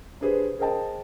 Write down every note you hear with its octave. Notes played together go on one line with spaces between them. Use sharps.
D4 G4 G#4 B4 C5
G#4 A#4 C5 D#5 G5 A5